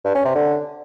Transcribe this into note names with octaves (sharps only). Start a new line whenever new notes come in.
G2
C#4
C3
D3